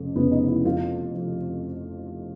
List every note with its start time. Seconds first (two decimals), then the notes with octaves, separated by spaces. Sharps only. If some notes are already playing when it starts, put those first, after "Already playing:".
Already playing: F1 F2 C#3
0.16 F1 F2 C#3 B3
0.32 D#4
0.48 E4
0.65 F2 C3 F3 F4
1.15 C3 F3